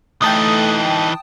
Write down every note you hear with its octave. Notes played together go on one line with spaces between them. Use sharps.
E3 A3 D#4 G5 A5 D#6